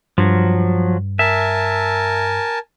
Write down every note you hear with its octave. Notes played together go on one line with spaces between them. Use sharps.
G2 F3 F#3
A#4 E5 G#5 A5